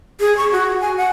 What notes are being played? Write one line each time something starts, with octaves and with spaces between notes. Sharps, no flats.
G#4
C#6
F#4
G#5
F#5